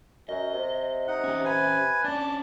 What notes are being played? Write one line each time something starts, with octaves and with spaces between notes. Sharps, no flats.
F#2 D#5
C3
D#4 F#5
C#4 G4
B4 G#5
C#4 D4 D5 A5